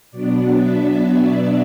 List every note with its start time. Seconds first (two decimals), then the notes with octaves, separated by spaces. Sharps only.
0.11 B2 F#3 B3 D4 D5
0.54 E5